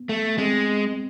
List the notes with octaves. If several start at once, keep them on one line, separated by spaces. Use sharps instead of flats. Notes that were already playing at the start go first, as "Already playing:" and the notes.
Already playing: B3
A3
G#3 C4